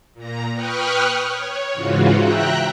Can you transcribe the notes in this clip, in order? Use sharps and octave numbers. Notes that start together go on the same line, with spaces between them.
A#2 A#5
B4 G5 C#6 D#6 F6 F#6
C#5
G#2 C#3 E3 F4 F#4
E5 G5 A#5 F#6